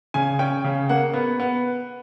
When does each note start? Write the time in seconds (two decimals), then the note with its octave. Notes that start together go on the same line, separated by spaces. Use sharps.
0.14 C#3 G#5
0.39 C#4 G5
0.64 C#3
0.89 A#3 F#5
1.14 B3
1.40 B3